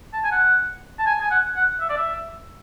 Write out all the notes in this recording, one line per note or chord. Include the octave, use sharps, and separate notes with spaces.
A5
G#5
F#5
A5
G#5
G#5
F#5
F#5
E5
D5
E5